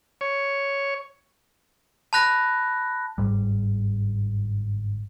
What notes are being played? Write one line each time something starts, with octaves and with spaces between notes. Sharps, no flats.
C#5
A5 B5 F#6 A#6
G1 E2 G#2 G3